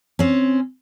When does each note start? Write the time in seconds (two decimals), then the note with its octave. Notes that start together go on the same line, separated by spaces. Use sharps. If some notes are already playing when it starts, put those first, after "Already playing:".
0.19 C4 C#4